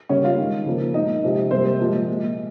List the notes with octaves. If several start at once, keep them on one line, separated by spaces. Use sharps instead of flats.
C#3 G3 A#3 C#4 C#5
F4 F5
D#3 G#3
C#3 F3 A#3
A#2 G#3 D#4 D#5
C3 F3 G#3
C3 G3 A#3 C4 C5
A#2 F3 G#3
A#2 G#3